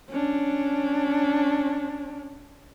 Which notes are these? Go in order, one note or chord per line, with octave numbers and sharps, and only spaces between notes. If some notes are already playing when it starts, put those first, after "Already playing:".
C#4 D4